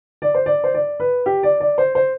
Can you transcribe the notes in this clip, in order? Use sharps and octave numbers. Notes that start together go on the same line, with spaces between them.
D5
C5
D5
C5
D5
B4
G4
D5
D5
C5
C5